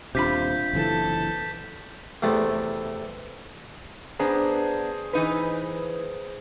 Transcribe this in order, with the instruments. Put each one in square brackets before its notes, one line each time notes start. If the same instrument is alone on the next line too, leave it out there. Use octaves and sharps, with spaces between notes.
[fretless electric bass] D#1 C3 [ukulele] D4 F4 B5 [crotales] G6 B6
[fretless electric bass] F#1 C3 E3 [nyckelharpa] A4 A5
[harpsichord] E2 C3 A3 B3
[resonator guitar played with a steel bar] B3 D4 [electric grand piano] G#4 C5 A#5
[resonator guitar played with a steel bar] E3 D#4 B4